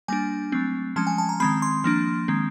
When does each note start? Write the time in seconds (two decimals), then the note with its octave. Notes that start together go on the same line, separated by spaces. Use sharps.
0.08 G3 A#3 D4 G#5
0.52 F#3 A3 C4
0.96 F3 G#3 C#4 A5
1.07 G#5
1.18 A5
1.29 A#5
1.40 D#3 G#3 C4 B5
1.62 C6
1.84 F3 A#3 D4
2.28 D#3 G#3 C4